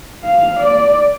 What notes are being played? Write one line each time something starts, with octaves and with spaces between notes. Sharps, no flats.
F5
D5